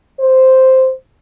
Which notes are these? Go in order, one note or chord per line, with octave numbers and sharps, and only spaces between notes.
C5